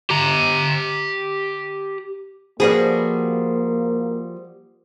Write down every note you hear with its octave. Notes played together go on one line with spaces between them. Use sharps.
G4 A#5
F3 G3 A#3 F#4 G#4 B4